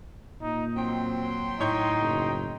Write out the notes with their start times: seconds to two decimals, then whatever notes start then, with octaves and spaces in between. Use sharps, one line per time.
0.42 A#2 D#4
0.76 F#3 C4 G5 C6
1.60 A2 D#4 C#5 G6
1.99 F#1